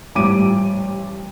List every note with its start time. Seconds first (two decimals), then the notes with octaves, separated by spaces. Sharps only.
0.15 A1 F3 G3 D6 D7 D#7